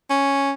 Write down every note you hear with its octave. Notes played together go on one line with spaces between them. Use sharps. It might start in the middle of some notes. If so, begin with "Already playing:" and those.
C#4